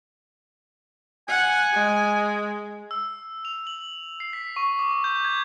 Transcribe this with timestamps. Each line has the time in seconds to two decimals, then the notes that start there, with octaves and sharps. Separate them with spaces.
1.29 F#5 G#5
1.73 G#3
2.91 E6
3.45 F7
3.67 F#7
4.20 C7
4.33 B6
4.56 C#6
4.79 D6
5.04 G6
5.25 G#6